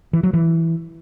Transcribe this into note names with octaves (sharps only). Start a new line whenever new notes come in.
E3
F#3
E3